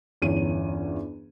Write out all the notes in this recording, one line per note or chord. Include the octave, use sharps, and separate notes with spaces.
G1 E2 C#4 D#7